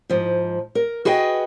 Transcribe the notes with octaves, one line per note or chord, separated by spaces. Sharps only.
G#2 F3
A#4
F#4 G#4 B4 D#5 G5